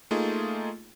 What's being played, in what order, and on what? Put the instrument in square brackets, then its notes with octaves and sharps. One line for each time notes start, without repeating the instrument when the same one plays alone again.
[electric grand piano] A3 A#3 D#4 F4 G#4